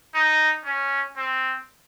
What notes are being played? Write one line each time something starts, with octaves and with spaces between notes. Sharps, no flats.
D#4
C#4
C4